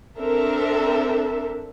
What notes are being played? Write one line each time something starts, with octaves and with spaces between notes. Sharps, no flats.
C4 D4 A4 A#4 E5